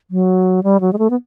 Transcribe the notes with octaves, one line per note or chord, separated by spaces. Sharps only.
F#3
G3
F#3
G#3
A3
B3